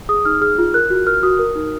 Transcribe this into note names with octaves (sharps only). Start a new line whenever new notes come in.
G#4 D#6
D#4 F6
G#4 F6
F4
A#4 F#6
F#4
A#4 F6
F#4 D#6
A#4
D#4